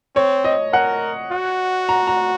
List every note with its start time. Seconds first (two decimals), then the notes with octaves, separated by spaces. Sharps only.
0.16 C4 C#5
0.44 D#5
0.73 A#4 F#5
1.31 F#4
1.89 A#5
2.07 A#5